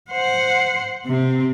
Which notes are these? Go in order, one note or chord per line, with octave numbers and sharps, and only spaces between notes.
C5 F#5
C3 C4